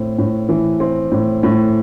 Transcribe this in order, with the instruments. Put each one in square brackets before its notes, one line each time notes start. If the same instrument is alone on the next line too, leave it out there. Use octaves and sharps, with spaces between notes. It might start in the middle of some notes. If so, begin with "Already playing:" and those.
Already playing: [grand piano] A2 C4
A2
E3
C4
A2
A2